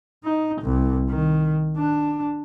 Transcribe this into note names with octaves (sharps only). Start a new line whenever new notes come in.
D#4
C2
D#3
D4